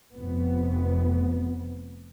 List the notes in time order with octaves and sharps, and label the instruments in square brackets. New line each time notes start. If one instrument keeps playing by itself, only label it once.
[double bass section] F1 F2 B3